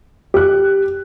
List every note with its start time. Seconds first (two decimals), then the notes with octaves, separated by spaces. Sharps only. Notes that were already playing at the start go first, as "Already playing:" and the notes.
0.34 G4 F#6